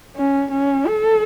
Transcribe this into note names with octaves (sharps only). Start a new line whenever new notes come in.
C#4
C#4
A4